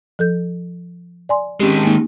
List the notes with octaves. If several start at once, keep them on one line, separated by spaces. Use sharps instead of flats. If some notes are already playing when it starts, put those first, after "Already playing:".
F3 A4 G6
D5 G#5 C6
D#3 G#3 C4 C#4 G4
A#3 D#4